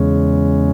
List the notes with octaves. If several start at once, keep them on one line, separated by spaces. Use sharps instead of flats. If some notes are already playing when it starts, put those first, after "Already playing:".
Already playing: E2 C#3 G#3 C#4